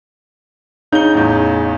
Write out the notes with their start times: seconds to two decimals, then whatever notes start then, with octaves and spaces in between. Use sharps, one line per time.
0.92 C#3 D#4 G6 G7
1.15 A1 E2